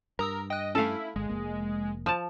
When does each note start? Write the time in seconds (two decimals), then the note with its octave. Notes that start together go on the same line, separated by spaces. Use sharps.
0.19 G2 A#4 A#5 D#6 E6
0.50 D#5 G5 F#6
0.75 A3 C#4 E4 A4 F5
1.16 G1 G#3
1.29 F1 F#2 A#3
2.06 F3 A5